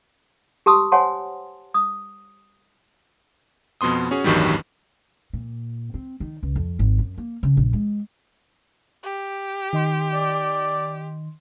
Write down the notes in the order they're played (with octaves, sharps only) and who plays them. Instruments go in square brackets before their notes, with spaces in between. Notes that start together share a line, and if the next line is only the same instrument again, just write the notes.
[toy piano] G4 B4 A5 C6 D#6 E6
C5 C#5 F#5 G#5 A5 C6
D#6
[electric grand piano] F2 B2 B3 C6 D#6
C#4 F#4 G#4
A1 E2 G2 D#3 F#3 G3
[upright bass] A#2
C4
D#3
C#2
F2
G#1
F#2
A#3
C#3
A#1
G#3
[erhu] G4
[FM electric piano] D#3 D#5 C6
[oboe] D5